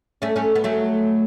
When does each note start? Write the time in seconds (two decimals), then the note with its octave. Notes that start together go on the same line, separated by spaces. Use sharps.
0.22 A3 C#4
0.36 A3 C#4
0.55 B3
0.64 F#3 A3